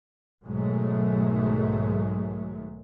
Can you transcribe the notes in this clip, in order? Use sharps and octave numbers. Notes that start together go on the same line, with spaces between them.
B1 G#2 D#3 F#3 G#3 A3